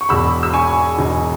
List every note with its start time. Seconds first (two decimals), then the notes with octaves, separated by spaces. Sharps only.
0.01 C#6
0.09 E1 E2 B2 B5 E6
0.43 E6
0.53 G#5 C#6
0.98 E1 E2 B2